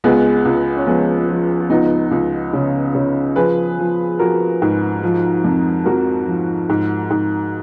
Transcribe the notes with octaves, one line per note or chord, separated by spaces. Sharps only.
C#2 G#3 B3
C#2
C#4
F3 G#3 B3
F3
F4
C#2 B3 D#4
C#2
C#3
C#3
F3 G#4 B4
F3
F3 F#4 A#4
G#2
F3
F2
F2 F#4 A#4
F3
G#2
G#2